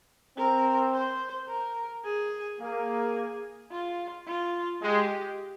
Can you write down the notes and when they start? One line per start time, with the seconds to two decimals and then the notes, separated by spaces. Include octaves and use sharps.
0.37 C4 A#4
0.93 C5
1.48 A#4
2.04 G#4
2.60 A#3 G#4
3.71 F4
4.27 F4
4.82 G#3 G4